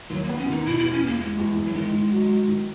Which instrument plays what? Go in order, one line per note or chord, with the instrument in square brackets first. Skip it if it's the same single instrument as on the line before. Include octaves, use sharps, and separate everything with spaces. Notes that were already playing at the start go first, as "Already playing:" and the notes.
[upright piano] D#2 [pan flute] F#3
[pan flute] A#3
[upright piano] B3
[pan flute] C#4
[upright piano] D#2 [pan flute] D#4
[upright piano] B2 [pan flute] E4
[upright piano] E2 [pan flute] E4
[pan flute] C#4
[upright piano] E2 [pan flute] A#3
[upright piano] E2 [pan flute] G#3
[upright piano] E2
E2
[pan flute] F#3
[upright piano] D#3 [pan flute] G#3
[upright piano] D#3
F#3
F#3
D#3